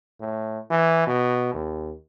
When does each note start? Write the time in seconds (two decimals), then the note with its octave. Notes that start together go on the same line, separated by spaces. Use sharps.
0.20 A2
0.70 E3
1.07 B2
1.54 D#2